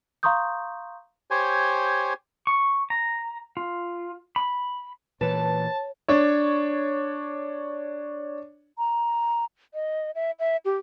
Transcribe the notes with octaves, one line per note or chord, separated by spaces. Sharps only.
F5 A#5 C6 C#6 D#6 G6
G4 C5 C#5 G#5
C#6
A#5
F4
B5
A#2 E3 B4 C#5 A5
D4 C#5
A#5
D#5
E5
E5
G4